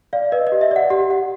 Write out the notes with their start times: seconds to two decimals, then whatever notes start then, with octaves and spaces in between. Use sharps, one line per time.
0.13 D5 F5
0.32 B4 D#5
0.47 D#5
0.52 G4
0.61 E5
0.71 D5 F#5
0.90 G4 F#5
1.10 G4 F#5